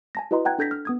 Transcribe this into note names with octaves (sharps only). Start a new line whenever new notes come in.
G#5 A5 A#6
E4 F#4 B4 D#5 A#5 C6
F#5 G5 A#5 F#6 G#6
D4 A4 G6 G#6 A#6 B6
F6
B3 D#6 G#6